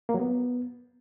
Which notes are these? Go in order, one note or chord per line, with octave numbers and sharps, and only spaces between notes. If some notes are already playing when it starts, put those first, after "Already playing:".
A#3
F#3
B3